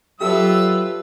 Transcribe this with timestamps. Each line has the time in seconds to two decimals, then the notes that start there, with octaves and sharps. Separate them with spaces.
0.20 F#3 F4 G4 A4 B4 E5 E6